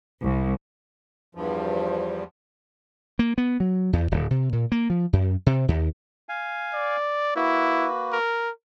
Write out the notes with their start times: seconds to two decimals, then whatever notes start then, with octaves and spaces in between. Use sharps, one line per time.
0.22 C2
1.35 E2 G2 F3
3.19 A#3
3.38 B3
3.60 F#3
3.93 E2
4.11 D1
4.31 C3
4.53 A#2
4.72 A#3
4.90 F3
5.13 F#2
5.46 C3
5.68 D#2
6.29 F5 G#5
6.73 D5
7.36 A#3 E4 F#4 B4
8.13 A#4